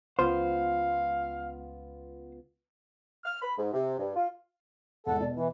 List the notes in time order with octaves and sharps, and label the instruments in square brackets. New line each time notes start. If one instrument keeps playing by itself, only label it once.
[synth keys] C#2 B3 F4 [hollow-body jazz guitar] C5 [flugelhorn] F5
[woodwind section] F6
B5
G#2
C3
G2
F4
[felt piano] G#1 E2 [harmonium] A4 [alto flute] F#5
[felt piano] B2 [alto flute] D5
[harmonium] E3 [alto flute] E4